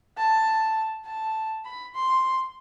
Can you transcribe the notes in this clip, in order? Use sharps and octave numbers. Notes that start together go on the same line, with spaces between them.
A5
A5
B5
C6